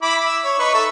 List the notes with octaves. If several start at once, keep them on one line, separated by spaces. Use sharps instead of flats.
E4 B5 D6
E5
C#5
D#4 B4 C#6
A4 E5